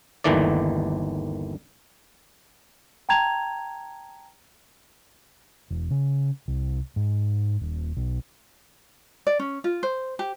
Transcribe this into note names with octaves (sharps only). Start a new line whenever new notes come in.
G1 D#2 D#3 E3 A3 D5
G5 A5 A#5 G#6 F7
E1
C#3
C2
G#2
D#1
B1
D5
C#4
F4
C5
G4